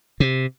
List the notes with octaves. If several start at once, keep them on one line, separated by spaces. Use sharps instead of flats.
C3